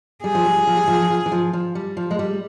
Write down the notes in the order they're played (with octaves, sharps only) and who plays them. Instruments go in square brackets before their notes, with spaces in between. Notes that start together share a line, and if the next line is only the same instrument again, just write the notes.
[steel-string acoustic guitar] G3 [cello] G#4
[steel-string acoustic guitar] F3
G3
F3
G3
F3
F3
E3
F3
F3
G3
F3
G#3
G3